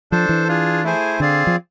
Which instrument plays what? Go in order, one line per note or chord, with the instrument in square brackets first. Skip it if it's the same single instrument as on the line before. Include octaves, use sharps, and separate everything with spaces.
[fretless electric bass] F3 [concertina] D4 A4 C5
[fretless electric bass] E3
[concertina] D4 F4 G#4
A3 E4 G#4 C5 G#5
[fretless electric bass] D3 [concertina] C4 G#4 D5 F5
[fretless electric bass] F3